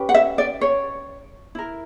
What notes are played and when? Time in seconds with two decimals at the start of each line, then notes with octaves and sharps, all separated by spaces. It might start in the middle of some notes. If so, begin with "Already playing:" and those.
Already playing: C#4 G4 B4
0.09 F#5
0.14 E5
0.38 D5
0.61 C#5
1.55 E4 A#4